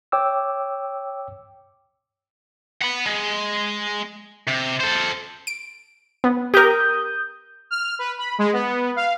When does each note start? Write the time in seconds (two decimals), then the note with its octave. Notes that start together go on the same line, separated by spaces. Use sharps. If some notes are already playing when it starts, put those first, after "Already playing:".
0.12 C#5 G5 D6 E6
2.82 F#5 B5
3.06 G#3
4.47 C3
4.80 A4 C5
5.47 D7
6.24 B3
6.54 G4 A#4 D#6 G6
7.71 F6
7.99 B4
8.18 B5
8.39 G#3
8.53 B3
8.96 F5